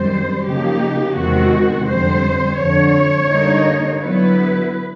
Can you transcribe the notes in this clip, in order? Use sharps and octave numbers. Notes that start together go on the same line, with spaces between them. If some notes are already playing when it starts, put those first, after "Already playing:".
Already playing: F#2 D#3 G3 C4 C5
C#3 F3 A#3 D#4 G4
E2 C3 D#3 G#3 C4 F#4
F2 D3 G3 C4 C5
F2 D3 F3 C#5
D3 G3 A#3 D#4
D3 F#3 B3 E4 B4